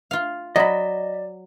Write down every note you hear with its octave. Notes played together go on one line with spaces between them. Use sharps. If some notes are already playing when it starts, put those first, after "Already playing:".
F4 F5
F#3 D5 D#5 B5